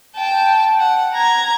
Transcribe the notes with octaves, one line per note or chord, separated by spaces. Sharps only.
G5 A5
F#5
A#5 G#6